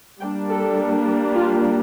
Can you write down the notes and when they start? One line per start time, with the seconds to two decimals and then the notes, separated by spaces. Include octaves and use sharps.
0.20 G3 A#3 D4 G5
0.49 A4
1.35 F4